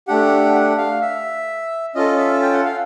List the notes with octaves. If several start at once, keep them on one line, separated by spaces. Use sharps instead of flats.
A3 D4 G4 F#5
F#5
F5
E5
C#4 F4 A4 D#5
E5
G5
F#5
F5